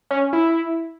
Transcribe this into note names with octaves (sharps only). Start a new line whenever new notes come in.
C#4
E4